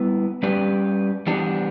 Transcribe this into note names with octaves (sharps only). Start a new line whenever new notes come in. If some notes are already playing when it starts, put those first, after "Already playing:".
Already playing: G3 B3 E4 B4
G3 C#4 G4 B4 D5
E3 G3 B3 D4 G4